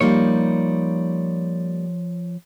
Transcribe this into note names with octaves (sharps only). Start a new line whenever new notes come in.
F3 G3 A#3 D#4 C#5